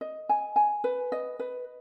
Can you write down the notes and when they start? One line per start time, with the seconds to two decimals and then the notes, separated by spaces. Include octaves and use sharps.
0.01 D#5
0.29 G#5
0.56 G#5
0.84 B4
1.12 D#5
1.39 B4